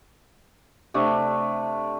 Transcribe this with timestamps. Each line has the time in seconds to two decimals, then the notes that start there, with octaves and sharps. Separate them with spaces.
0.94 C3 A3 D4